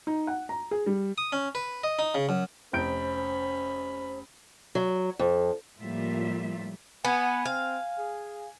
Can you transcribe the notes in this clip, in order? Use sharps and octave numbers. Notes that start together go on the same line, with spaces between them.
D#4
F#5
A#5
G#4
G3
D#6
C#4
B4
D#5
D#4
C#3
F#2
F1 C#4 C5 B5 G6 D7
F#3
F2
A2 F3 G3 A#3 F4 E5
B3 F#5 G#5 G#6
C4 F5
G#4